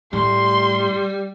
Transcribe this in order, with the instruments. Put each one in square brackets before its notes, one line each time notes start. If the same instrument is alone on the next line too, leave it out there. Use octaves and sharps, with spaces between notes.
[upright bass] A2 [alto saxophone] G3 [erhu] C6